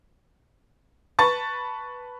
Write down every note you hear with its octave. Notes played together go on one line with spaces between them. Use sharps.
B4 A5 C#6 A6